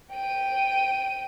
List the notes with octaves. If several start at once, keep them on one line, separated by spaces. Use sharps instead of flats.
G5 D#7